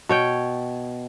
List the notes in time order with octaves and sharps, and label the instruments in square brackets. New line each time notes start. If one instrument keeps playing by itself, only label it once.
[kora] B2 C#5 G5